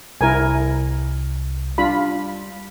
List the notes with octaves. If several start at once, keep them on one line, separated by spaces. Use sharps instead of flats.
C2 E4 A#4 G#5
G3 D4 F4 B5